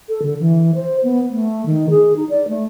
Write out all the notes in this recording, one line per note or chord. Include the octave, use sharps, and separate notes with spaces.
A4
D3
E3
C5
B3
A3
D#3
G#4
D#4
D5
A3